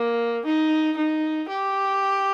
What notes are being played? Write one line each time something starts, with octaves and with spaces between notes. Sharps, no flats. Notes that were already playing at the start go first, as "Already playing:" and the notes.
Already playing: A#3
D#4
D#4
G4